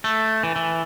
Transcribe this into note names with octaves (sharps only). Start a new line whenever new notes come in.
A3
E3
E3